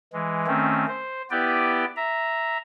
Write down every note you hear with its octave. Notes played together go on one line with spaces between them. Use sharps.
E3 G#3
D#3 A3 C4 C#4
C5
B3 E4 G4 B4 D5 G5
E5 A#5